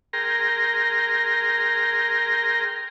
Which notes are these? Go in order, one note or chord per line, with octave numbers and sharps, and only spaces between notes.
G#4 A#4 G5 A#5 C6